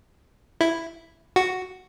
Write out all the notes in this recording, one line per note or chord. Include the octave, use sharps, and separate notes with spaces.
E4
F#4